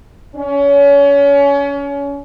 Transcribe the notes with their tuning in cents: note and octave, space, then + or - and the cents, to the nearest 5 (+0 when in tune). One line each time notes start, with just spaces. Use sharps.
C#4 +30